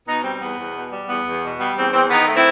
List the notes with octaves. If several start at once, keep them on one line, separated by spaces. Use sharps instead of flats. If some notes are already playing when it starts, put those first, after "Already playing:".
B2 B3 D#4
G3 C4
E2 B3
E2
B2
G3
E2 B3
E2
B2
G3 B3
E2 C4
E2 C4
D#3 B3 D#4
A3
C4 E4